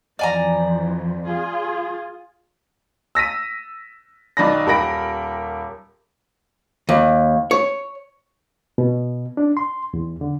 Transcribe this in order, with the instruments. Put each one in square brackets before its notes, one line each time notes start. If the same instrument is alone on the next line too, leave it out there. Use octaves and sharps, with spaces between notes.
[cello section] F2 E3 [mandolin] D5 G#5 A#5
[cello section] F4 G#4
[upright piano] E6 A#6 B6 D#7
B1 D#3 D5 B5 A#6
D#1 G4 A#4 B5 A#6 D7
[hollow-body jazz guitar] D#2
C#5
[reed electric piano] B2
D4
C6
E2
D3